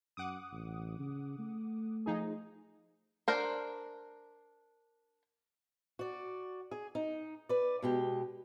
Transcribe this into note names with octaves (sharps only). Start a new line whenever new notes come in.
F#2 F#5 D6 D#6
A1
C#3
A3
F3 D#4 G#4
D4 A#4 C5
F#4 D5
G#4
D#4
B4 D5
B2 G#3 G4